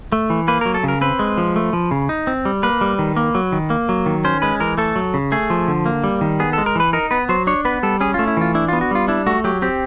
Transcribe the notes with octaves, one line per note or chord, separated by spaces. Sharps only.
A3
E3
A#3 B4
F#3 A#4
A4
C#3 A#4
C4 B4
G#3
F3
A3
F3
C#3
D#4
C4
G3
A#3 B4
G3
D#3
A#3
F#3
D#3
A#3
F#3
D#3
C#4 C5
G#3 B4
E3 A#4
A3 A4
F#3
C#3
A3 G#4
F3
D3
A#3
G3
D#3
B3 G#4
A4
G#3
A#4
E3 B4
D#4 A#4
B3 B4
F#3 C5
D4 C#5
B3 B4
G3 A4
C#4 G#4
F4
A3
E4
E3 F4
D4 E4
F4
B3
F#4
G3 F4
D4 E4
A3 F#4
F#3 G4
C4 G4